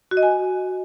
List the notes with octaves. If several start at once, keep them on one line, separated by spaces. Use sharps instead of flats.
F#4
D#5
G#5